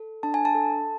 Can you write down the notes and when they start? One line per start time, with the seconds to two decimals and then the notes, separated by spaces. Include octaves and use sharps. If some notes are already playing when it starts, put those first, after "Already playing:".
Already playing: A4
0.23 D4 A5
0.34 G#5
0.45 A5
0.55 A4